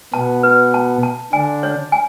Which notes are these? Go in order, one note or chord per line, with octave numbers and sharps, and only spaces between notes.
B2 B3 A5
B4
A5
A5
D3 D4 G#5
C#5
G#5